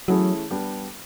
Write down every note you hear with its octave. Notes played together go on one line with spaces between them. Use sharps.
E3 F#3 A3 C#4 E4 G#4
G3 B3 D4 G4